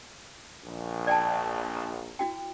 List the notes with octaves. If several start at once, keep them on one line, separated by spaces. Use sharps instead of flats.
A#1
D5 G5 A5
A#5
E4 F#4 G5